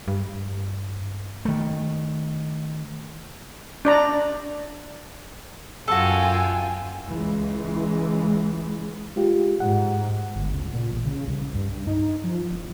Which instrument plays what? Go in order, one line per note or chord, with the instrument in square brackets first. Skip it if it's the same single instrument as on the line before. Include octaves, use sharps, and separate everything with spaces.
[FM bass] G2
[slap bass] D#3 A3
[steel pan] D4 D5 A#5
[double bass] F#2 [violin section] F4 G5 G#5 [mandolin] F#4 A4
[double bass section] C#2 E3 G#3
[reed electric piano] G#3 F4 G4
[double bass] G#2 [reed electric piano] F#5
[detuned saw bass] G1
C#2
A#2
A1
C#3
C2
G2
D#4
F3
E1